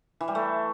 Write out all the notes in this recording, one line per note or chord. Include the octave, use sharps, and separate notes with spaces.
E3
G3
A3